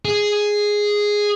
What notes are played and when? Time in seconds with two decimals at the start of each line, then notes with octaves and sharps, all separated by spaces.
0.05 G#4